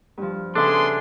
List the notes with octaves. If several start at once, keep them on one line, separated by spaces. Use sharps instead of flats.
G2 F3
C#3 B3 D4 A4 E5 G#5 C6